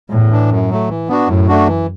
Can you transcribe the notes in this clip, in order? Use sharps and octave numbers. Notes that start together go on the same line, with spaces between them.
E2 A2
E3 D4
F#2
F#3 A3
E3
B3 D4 F#4
F#2 A2
A3 D4 F#4
E3